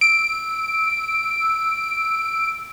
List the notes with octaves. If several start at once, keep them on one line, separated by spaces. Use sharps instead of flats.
E6 D7